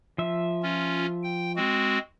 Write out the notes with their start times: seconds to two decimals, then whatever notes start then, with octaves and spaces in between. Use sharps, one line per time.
0.18 F3 E5
0.63 C#4 F4
1.23 G5
1.56 G#3 C4 F#4